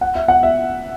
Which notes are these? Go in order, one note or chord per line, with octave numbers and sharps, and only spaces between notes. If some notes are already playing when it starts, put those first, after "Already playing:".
F#5
E5
F#5
E5